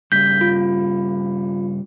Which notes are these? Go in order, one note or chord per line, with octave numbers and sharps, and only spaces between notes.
G2 C#3 G3 G6 B6
F4